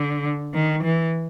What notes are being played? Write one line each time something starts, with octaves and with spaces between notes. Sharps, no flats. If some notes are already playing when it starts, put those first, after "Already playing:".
Already playing: D3
D#3
E3